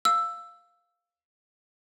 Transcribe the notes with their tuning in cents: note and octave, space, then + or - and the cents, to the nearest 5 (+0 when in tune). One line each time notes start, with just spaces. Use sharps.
F5 +0 E6 +5